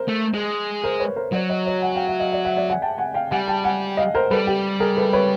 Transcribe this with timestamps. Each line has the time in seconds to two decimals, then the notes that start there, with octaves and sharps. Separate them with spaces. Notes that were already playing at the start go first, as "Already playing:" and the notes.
Already playing: A#4 C5
0.08 A3
0.34 G#3
0.84 A#4 C5
1.00 B4 C#5
1.16 A#4 C5
1.33 F#3 C5 D5
1.49 C#5 D#5
1.66 C#5 D#5
1.82 F#5 G#5
1.95 F5 G5
2.07 E5 F#5
2.20 D#5 F5
2.32 D5 E5
2.45 E5 F#5
2.56 D5 E5
2.69 F#5 G#5
2.82 G5 A5
2.98 F#5 G#5
3.14 F5 G5
3.31 G3 F#5 G#5
3.48 G5 A5
3.64 F#5 G#5
3.97 D#5 F5
4.15 A#4 C5
4.31 G3 A4 B4
4.47 G4
4.80 G#4 A#4
4.97 A4 B4
5.13 B4 C#5